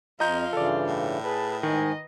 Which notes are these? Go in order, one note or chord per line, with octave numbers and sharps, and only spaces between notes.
F2 F3 F4 D#5 A#5 G6
G2 C#3 E3 A4 D5
A2
G#4 B4 A5
G#2 D#3 D#5 G#5